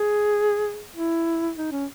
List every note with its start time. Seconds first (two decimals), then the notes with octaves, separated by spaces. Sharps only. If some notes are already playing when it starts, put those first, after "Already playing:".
Already playing: G#4
0.96 E4
1.57 D#4
1.72 C#4